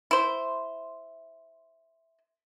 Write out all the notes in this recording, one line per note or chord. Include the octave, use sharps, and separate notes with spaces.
E4 C5